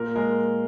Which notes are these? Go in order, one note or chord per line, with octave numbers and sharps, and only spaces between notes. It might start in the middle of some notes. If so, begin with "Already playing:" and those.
Already playing: A#2 A#4
G#3 A#4